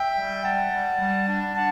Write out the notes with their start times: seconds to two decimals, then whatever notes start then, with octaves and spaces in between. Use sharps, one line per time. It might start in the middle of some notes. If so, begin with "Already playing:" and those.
Already playing: E5 G5
0.16 G3
0.44 G3 F#5 A5
0.71 G3
0.99 G3
1.28 D4
1.55 D4 F#5 A5